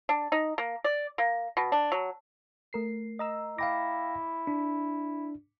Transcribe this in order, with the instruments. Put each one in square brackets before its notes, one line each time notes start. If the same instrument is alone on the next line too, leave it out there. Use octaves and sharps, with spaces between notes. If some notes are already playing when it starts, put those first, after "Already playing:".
[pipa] D4
D#4
A#3
D5
A#3
B2
D4
F#3
[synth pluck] A3 A#4 C7
D#5 A#5 E6
[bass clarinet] E4 [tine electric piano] F5 G5 A#6 [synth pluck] D6
[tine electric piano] D4